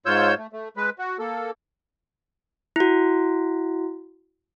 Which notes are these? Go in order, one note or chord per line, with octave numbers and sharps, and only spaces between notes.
G#2 F4 C#5 E6 G6
A3
A3
G#3 B4
F#4
A#3 A4
E4 F#4